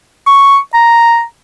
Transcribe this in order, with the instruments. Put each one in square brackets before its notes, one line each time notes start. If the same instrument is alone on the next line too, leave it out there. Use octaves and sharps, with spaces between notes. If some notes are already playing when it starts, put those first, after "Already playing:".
[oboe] C#6
A#5